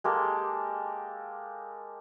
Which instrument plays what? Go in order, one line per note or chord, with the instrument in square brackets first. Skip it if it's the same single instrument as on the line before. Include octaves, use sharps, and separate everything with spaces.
[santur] G#3 A#3 G4 A4